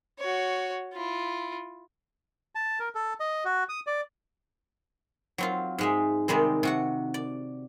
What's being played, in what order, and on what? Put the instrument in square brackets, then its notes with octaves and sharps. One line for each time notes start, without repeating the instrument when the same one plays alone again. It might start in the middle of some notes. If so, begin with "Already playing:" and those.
[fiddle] F#4 C#5
E4 F4
[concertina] A5
A#4
A4
D#5
F#4
D#6
D5
[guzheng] F#3 C4 F4
G#2 G#3 E5
C3 D#3 G3 G#3 C4
C3 F#4 F#5
D5